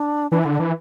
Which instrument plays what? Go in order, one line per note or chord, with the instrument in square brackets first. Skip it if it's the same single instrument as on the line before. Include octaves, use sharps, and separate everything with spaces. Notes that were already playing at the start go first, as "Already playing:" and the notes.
Already playing: [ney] D4
[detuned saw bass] E3 [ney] D4
[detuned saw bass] D3 [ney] E4
[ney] D4
[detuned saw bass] E3